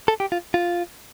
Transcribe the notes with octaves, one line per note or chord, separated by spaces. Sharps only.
A4
G4
F4
F4